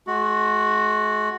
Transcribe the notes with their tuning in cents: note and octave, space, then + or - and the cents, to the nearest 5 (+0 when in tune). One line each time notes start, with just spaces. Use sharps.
G#3 +40 F#4 +0